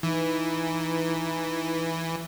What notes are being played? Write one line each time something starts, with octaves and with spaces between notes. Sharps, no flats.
E3 D#4